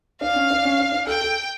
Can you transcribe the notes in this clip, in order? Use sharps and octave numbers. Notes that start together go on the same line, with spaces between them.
D4 F5
C#4
D4
C#4
D4
D4
A4 G5
A4